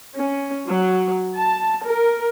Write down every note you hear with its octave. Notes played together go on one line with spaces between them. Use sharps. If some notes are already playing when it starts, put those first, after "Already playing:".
C#4
F#3
A5
A#4